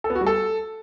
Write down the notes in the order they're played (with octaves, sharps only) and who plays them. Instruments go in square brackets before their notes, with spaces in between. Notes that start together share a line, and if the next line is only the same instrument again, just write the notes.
[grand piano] A4
B3
F#4
G3
A4